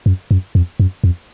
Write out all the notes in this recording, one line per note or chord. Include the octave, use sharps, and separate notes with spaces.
F#2
F#2
F2
F#2
F2